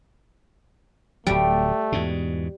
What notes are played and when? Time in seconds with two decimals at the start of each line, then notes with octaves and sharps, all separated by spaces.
1.27 D1 F#3 G3 A3
1.92 E2 G#2 B2